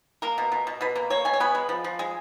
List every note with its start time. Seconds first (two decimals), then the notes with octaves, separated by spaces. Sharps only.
0.22 A#3 A#4
0.38 B2
0.52 B2
0.67 B2
0.81 B2 B4
0.96 A#3
1.10 A#3 C#5
1.25 B2 G#5
1.33 C#5
1.40 B3 B4
1.55 G#3
1.69 F3
1.84 F3
1.99 G#3